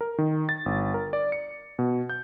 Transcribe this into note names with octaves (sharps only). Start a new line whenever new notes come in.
A#4
D#3
A6
G1
A#4
D5
C#7
B2
G6